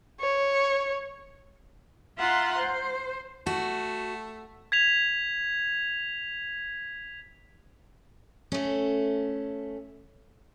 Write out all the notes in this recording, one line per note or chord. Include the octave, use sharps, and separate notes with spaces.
C#5
F4 E5 F#5 A#5 C6
C5
A3 F#4
G#6 B6 F7
A3 C#4